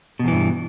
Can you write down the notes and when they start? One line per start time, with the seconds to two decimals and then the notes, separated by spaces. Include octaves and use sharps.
0.19 B2
0.24 E2
0.28 E3
0.32 G2